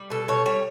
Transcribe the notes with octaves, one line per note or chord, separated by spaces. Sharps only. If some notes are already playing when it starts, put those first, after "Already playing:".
Already playing: G3
B2 A4
B2 C#5
G3 C#5